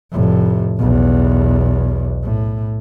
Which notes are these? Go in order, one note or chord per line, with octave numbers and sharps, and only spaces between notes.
F1 A2
B1 E2
A2